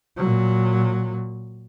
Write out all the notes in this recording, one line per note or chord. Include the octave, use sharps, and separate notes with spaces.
A#2 F#3